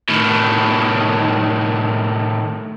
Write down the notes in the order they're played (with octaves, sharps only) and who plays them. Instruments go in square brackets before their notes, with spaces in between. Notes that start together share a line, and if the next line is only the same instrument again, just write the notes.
[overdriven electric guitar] A2 D#3